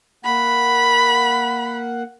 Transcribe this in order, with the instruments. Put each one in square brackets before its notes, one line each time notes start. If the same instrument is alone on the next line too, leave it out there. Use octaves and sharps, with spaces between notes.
[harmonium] A#3 F#5 [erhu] B5